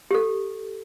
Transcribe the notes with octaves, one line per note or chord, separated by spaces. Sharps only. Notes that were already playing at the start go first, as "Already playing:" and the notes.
G4 A4